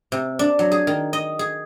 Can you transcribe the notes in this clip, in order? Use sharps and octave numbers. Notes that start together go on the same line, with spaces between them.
C3
D4
F#3
G#4
D#3
D#5
G#4